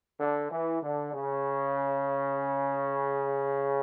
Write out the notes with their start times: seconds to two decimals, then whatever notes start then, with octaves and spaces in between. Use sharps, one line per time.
0.19 D3
0.50 E3
0.81 D3
1.14 C#3